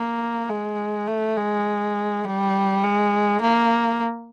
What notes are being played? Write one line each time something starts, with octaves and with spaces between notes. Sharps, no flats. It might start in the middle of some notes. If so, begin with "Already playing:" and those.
Already playing: A#3
G#3
A3
G#3
G3
G#3
A#3